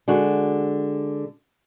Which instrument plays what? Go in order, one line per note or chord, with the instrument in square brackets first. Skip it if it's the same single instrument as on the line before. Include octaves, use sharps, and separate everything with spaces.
[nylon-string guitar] D3 G#3 F#4